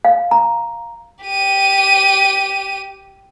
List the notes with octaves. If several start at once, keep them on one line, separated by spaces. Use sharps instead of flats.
F5
A#5
G4 D#7